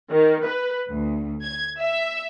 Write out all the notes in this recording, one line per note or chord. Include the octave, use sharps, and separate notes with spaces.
D#3
B4
D2
G#6
E5